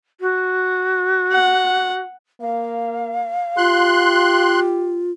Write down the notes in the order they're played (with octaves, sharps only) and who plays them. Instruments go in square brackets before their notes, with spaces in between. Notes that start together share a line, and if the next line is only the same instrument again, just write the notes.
[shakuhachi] F#4
[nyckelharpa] F#5
[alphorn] A#3 [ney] F5
[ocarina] F4 [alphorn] G4 [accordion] C6 F#6